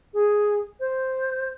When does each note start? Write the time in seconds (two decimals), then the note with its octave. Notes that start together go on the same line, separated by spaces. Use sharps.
0.14 G#4
0.80 C5